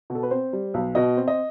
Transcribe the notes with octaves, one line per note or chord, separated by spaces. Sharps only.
B2
A4
B4
C4 C5
G3
B1
B2 D#5
C4
D#5